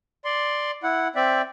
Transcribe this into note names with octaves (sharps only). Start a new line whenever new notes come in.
D5 C6
E4 F#5
C4 D5 E5